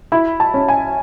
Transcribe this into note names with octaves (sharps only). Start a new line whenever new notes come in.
E4 B5
A5
C#4
G#5